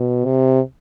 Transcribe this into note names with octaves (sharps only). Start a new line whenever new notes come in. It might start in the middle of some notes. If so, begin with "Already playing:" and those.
Already playing: B2
C3